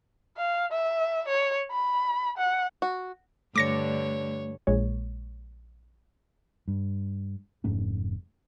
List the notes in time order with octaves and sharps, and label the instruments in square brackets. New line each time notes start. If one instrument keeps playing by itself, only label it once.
[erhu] F5
E5
C#5
B5
F#5
[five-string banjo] F#4
[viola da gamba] G2 D3 [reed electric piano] A3 [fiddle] C#5 [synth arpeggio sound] D6 A#6 C#7
[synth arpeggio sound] A#1 G#3 C#5
[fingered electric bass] G2
F1 G#2 A3 C#4